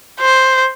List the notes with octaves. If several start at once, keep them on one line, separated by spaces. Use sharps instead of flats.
C5